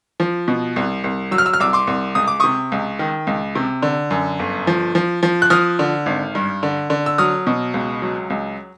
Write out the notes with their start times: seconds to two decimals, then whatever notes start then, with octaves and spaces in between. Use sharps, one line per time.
0.20 F3
0.48 B2
0.76 C2
1.04 C2
1.31 F#3 E6
1.38 F6
1.46 E6
1.53 F6
1.60 C2 D6 E6
1.73 C6 D6
1.87 C2
2.15 C#2 D#6
2.28 D6
2.40 C3 C#6 D#6
2.72 C#2
2.99 D#3
3.27 C#2
3.55 C3
3.82 D3
4.11 F#2
4.39 G1
4.67 F3
4.95 F3
5.23 F3
5.42 F#6
5.50 F3 D#6 F6
5.79 D3
6.06 G#1
6.35 G2
6.63 D3
6.90 D3
7.06 E6
7.18 F#3 D#6 F6
7.47 B2
7.74 C#2
8.02 F#3
8.30 C#2